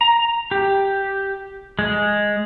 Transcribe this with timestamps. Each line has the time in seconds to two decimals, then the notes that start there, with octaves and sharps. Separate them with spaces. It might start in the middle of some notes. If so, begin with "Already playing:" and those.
0.01 A#5
0.51 G4
1.79 G#3